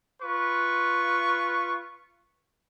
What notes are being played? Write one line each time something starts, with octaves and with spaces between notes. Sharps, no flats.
F4 B4 C#6